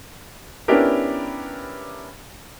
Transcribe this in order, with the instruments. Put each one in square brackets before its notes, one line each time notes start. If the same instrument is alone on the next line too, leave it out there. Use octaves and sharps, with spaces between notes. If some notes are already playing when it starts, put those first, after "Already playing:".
[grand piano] B3 C#4 D4 E4 G4 A#4